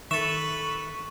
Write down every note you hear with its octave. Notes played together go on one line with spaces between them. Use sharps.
D#3 A4 B4 E5 C#6